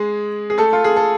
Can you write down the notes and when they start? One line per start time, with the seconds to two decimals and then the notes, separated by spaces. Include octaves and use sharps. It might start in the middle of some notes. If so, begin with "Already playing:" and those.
Already playing: G#3 G#4
0.50 G#4
0.58 A3 A4
0.73 F4
0.84 G#4
0.96 A4